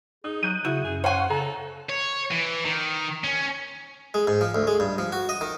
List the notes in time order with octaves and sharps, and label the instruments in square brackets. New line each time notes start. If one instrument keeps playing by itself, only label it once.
[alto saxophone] D#4 [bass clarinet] G#4 [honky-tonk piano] D#6
[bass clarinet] F#3 [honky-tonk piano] F#6 G6 D#7
[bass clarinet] C#3 [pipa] E4 [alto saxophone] F#4
[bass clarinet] F#2 [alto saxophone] G#4
[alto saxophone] C5 [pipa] C#5 G#5 [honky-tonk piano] F5 F#5 C#6
[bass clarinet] C#3 [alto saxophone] A4 [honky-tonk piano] A#5
[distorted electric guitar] C#5
E3
D#3
C#4
[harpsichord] G#3
G#2
F3
D2
G#3
G2
F3
F#4
D#5
D#3